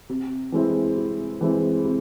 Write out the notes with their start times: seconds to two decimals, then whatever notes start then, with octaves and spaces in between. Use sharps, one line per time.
0.09 C3
0.52 E3 G#3 C4 E4
0.97 C3
1.41 E3 G#3 C4 E4
1.85 C3